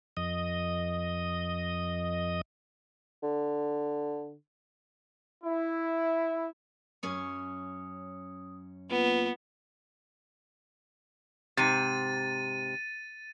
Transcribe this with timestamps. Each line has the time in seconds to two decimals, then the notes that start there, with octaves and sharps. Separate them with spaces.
0.17 F2 D#5
3.23 D3
5.44 E4
7.03 F#2 C#4 C#5 D#6
8.90 A#3 B3 F4 B4
11.57 G#2 C3 A6 D#7